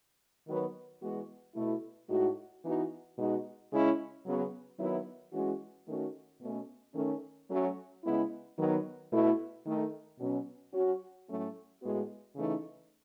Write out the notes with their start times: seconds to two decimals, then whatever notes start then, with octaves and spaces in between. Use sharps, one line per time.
0.47 D#3 F#3 B3
1.01 E3 G#3 B3 F#4
1.55 B2 A3 E4
2.09 A2 G#3 D#4 F#4
2.63 E3 B3 D#4 F#4
3.17 B2 G#3 D#4 F#4
3.71 C#3 G#3 C#4 E4
4.25 C#3 F#3 B3
4.79 D#3 F#3 B3 E4
5.33 E3 G#3 C#4 F#4
5.87 D#3 A3 C#4 F#4
6.41 B2 A3 C#4
6.95 D#3 A3 C#4
7.49 F#3 A3 C#4
8.04 C#3 G#3 B3 E4
8.57 D#3 F#3 B3
9.11 B2 A3 E4
9.65 D#3 A3 D#4
10.19 B2 F#3 C#4
10.73 F#3 C#4 F#4
11.27 A2 F#3 A3 C#4
11.82 A2 G#3 B3 F#4
12.35 C#3 E3 A3 D#4